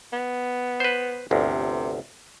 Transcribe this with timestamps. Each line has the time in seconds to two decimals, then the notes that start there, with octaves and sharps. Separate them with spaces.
0.13 B3
0.80 B4 C5
1.31 G1 D2 C3